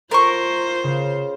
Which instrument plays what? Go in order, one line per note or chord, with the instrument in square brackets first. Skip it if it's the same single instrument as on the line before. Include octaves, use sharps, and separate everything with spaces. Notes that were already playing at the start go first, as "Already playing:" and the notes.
[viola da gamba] F4 C5 [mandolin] A#4 C#6
[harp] C#3 F5